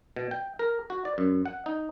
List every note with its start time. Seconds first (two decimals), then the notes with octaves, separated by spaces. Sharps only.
0.16 B2
0.31 G5
0.59 A#4
0.90 F#4
1.05 D5
1.18 F#2
1.46 F#5
1.66 D#4